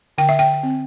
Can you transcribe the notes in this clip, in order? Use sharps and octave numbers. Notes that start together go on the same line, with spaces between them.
D3 G5
E5
G5
C4